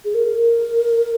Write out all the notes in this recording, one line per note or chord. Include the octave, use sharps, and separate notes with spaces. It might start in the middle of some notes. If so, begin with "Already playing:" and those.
G#4
A#4